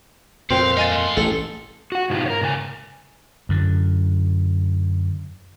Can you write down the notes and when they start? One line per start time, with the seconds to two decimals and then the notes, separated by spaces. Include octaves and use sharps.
0.50 F2 A#2 C4 F5 G5
0.77 G#3 D#5 F5 G#5 A6
0.92 A2 C6
1.17 A1 A4
1.92 F#4 F#5
2.10 G#2 B2 D#4 F4 G4
2.26 A#4 C#5
2.41 G#2 C#3 A4 G#5
3.49 F#2 D3